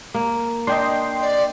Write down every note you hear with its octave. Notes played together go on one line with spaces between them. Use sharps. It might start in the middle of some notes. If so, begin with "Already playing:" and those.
A#3
D4 D#5 G5 C6
D5